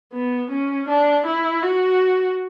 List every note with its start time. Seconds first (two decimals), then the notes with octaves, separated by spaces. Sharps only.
0.13 B3
0.50 C#4
0.88 D4
1.26 E4
1.63 F#4